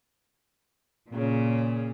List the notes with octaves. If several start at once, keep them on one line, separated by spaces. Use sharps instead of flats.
A#2 C#3